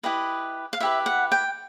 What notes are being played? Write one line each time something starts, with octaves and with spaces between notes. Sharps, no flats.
E4 G4 B4 D#5
F5
E4 G4 B4 E5
F#5
G5